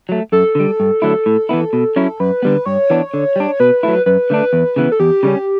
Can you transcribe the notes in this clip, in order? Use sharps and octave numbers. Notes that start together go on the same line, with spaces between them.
F#3 A3
F#2 A4
D3 G3
G2
D3 F#3 A3 E4
A2
E3 B3 E4
B2
F#3 C#4 E4
F#2 B4
D3 G3 B3
G2 C#5
E3 B3 D4
D3
G3 D4
B2 B4
F#3 A3 E4
F#2 B4
D3 A3 D4
E2
C#3 E3 B3
A4
E2 G4
C#3 G3 C#4